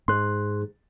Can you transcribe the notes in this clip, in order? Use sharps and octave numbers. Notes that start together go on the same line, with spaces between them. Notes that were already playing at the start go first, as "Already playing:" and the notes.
G#2 C6 F#6